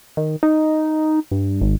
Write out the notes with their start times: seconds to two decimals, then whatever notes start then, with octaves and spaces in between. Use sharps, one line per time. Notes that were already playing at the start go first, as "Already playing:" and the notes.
0.17 D#3
0.43 D#4
1.31 G2
1.62 G#1